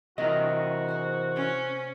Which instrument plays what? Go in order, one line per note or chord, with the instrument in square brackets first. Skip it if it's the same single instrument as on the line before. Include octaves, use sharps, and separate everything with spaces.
[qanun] C3 G3 C4 [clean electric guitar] E3 A#4 D#5 [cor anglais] F#4
[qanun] G#4 C5
[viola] C#4